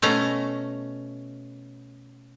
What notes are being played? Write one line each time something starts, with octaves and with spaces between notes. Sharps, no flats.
B2 A3 C#4 A#5